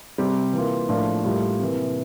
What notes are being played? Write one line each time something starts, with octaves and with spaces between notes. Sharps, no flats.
C3 G3 C4 G4
E3 A#3 F4
A2 F3 A#3 D4 F4
A2 G3 A#3 F4
C3 E3 A#3